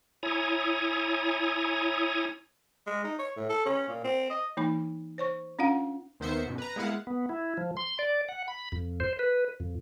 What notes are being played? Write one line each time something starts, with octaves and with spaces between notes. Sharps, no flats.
E4 C#5 G#5 A#5 D#6
G#3
D#4
C#5
A2
A4
C#4
A#2
C4
D#5
E3 A#3 D#4 B5
C5 C#5 C#6
C#4 D4 F4 F5 F#5
D#2 D#3 B3 C5 E5 C#7
F#2 B2
B4 A#5
G#3 A#3 B3 E4 F5 F#5
B3
E4
F3
C6
D5
F#5
B5
F2
C5
B4
F2